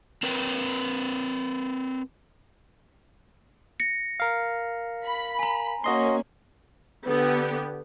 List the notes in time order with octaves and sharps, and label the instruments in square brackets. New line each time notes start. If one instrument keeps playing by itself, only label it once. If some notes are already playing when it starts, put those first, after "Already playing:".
[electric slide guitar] C4 A#4 B4 G5
[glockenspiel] A#6 C#7
[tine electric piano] A#4 F5
[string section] B5
[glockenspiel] G#5 A#5
[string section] A#3 C#4 [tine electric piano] F#4 D#5 C6
[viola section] D3 B3 G4